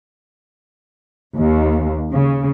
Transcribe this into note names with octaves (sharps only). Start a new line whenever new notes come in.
D#2
C#3